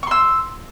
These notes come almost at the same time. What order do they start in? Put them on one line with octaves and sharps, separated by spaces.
C#6 C6 E6